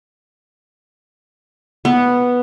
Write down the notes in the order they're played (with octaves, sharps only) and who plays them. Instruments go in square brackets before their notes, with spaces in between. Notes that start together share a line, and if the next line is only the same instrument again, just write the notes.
[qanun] B3